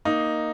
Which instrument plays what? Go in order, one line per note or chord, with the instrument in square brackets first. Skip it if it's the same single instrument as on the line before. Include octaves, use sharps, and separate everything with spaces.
[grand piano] A#3 D#4